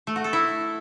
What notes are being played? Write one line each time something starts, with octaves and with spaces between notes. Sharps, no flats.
A3
F#4
A4
E4